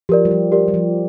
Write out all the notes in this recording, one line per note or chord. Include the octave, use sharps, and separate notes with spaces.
F3 G4 A#4 D5
G3
F3
G4 A#4 D5
G3
F3